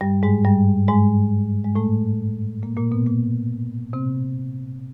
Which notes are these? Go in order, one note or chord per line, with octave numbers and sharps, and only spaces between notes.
G2 G3
G#2 G#3
G2 G3
G#2 G#3
G#3
A2 A3
A#2 A#3
A#2 A#3
B2 B3
A#2 A#3
C3 C4